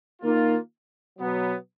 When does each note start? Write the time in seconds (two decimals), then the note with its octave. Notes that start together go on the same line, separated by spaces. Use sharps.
0.22 D#3 A#3 F4
1.19 B2 F#3 B3